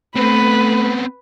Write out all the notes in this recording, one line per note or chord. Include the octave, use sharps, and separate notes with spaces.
A3 B3 C4 B4